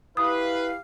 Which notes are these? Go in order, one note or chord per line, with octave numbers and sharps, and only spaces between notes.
E4 G4 B4 F5 D#6